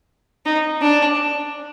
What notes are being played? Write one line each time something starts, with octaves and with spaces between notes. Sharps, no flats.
D#4
D4